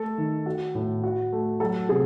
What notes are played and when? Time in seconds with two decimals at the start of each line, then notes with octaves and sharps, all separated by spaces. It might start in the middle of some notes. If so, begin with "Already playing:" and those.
Already playing: A3 A4
0.18 D#3
0.46 F#4
0.75 A2
1.03 F#4
1.33 A3
1.60 F#3 A4
1.89 C3 G#4